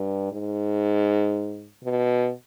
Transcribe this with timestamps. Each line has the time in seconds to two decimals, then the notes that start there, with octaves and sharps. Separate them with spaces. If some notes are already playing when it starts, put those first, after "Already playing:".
Already playing: G2
0.32 G#2
1.84 B2